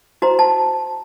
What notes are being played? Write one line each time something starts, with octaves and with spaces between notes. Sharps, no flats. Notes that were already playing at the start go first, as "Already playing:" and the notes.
F#4 C5 A#5
A5